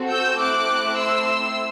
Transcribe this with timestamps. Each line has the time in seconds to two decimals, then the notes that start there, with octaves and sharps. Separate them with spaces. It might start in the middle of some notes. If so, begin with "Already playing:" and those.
Already playing: C4 F#4 A4
0.10 E6 G6
0.39 A3 C4 E4 D6 F#6
0.97 C6 E6